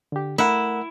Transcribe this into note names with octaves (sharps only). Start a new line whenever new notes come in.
D3 G4
A3 E4 A#4 F#5